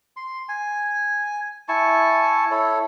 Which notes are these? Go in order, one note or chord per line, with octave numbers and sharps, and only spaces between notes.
C6
G#5
E4 G#5 A5 C#6
E4 A4 C#5